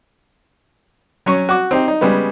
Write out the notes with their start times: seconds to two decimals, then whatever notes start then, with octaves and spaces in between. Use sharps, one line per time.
1.26 F#3 C#4 C#6
1.49 F#4 D6
1.71 C4 D#4 G4
1.88 D#4
2.01 C#3 G3 G#3 B3